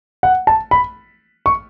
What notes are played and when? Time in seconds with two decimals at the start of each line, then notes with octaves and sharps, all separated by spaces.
0.23 F#5
0.47 A5
0.71 B5
1.46 C#6